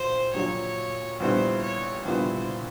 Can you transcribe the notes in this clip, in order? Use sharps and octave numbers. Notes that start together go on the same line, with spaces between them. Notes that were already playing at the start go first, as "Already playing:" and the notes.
Already playing: A#1 A#2 F#3 C5
A#1 A#2 F#3 C#5
A#1 A#2 G3 B3 E4 C5
C#5
A#1 A#2 G3 B3 E4 C5